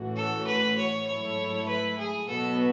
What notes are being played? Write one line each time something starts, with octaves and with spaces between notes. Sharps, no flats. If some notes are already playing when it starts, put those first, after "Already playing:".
Already playing: A2 E3 A3 C#4 F#4
A4
B4
C#5
G#2 F#3 A3 E4 A4 C#5
B4
G#4
B2 F#3 B3 F#4 A4 B4